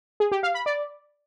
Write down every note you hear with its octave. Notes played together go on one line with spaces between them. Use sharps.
G#4
G4
F5
B5
D5